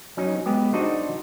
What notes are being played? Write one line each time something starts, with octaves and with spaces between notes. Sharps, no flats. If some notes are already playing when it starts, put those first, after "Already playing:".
F#3 C#4 D#4
G#3 B3 G4
D4 D#4 F#4 C5 D5 D#5